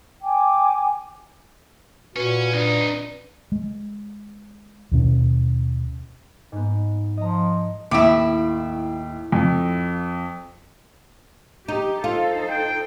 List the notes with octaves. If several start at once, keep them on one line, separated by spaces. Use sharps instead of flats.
G5 G#5 D6
A#2 C#4 F#4 B4
F#2 D4 D#4
G#3
D#2 B2 C#4
G#2 B3
F3 D#5 A#5
D#2 A2 E4 D6 D7
F2
D#4 G4
D#4 F4 A4 C5
G5